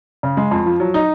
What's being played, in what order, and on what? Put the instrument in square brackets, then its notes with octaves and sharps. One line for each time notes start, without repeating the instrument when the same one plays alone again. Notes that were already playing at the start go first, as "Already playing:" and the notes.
[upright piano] C#3
G#3
F2
F3
F#3
D#4